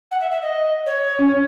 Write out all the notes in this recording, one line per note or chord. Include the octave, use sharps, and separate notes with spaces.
F#5
E5
E5
D#5
C#5
C#4